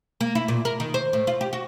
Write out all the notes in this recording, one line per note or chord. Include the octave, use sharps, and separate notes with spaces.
A#3
E4
A#2
A#4
D#3
C5
A2
F4
G4
F#4